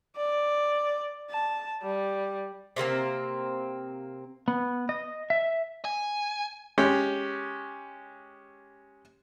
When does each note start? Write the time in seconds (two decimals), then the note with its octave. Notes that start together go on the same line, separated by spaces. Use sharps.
0.17 D5
1.30 A5
1.83 G3
2.76 C3 A3 A#3 C4
4.48 B3
4.89 D#5
5.30 E5
5.85 G#5
6.78 G#3 C#4 G4